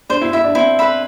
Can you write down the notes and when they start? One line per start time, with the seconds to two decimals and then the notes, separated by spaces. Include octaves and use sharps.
0.10 D4 C5
0.22 E4
0.33 E4 E5 B5
0.44 D4
0.55 C4 E4
0.79 B4 E5 B5